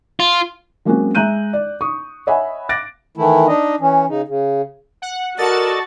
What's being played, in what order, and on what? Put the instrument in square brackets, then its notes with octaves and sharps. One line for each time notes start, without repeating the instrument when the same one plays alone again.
[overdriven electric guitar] F4
[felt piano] F#3 G#3 A#3 C4 C#4 F#4
G#3 E5 A#5 F#6 G6 D#7
D5
C#6 D#6
C#5 D#5 E5 F#5 G#5 B5
D6 F#6 A6 A#6 D7
[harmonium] D#3 E3 A3 E4
D4 D#4 D#5
E3 C#4
C#3 D#4
C#3
[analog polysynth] F#5
[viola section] F#4 [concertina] A4 D5 D#5 [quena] A#4 [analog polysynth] A5 A6